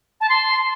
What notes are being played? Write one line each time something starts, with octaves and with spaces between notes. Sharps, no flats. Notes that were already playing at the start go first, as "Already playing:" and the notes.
A5
C6